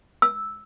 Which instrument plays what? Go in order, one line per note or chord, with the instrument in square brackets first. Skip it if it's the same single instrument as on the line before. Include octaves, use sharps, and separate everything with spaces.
[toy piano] E6